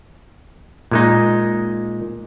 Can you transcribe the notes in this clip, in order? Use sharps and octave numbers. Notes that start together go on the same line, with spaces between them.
A#2 G#3 D#4